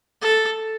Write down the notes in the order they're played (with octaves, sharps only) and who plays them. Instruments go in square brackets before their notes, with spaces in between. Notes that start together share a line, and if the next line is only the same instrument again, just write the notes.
[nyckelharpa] A4